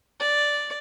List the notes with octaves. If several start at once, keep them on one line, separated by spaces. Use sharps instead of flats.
D5